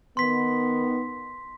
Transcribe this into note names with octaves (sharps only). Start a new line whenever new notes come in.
D#3 B3 C6 B6